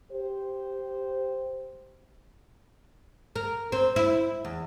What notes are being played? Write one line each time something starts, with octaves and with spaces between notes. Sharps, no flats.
G4 C5
A#4
C4
E4
E2